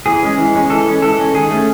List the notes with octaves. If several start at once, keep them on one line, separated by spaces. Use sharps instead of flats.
E3 G#4
G#3 C#4
E3
G#3 C#4
E3 A4
G#3 C#4
E3 A4
G#3 C#4
D#3 G#4
A3 C#4